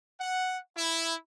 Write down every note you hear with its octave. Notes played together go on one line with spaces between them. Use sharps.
F#5
E4